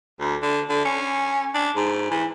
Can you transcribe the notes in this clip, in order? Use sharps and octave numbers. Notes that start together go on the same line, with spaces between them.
D2
D3
D3
C#4
D4
G#2
E3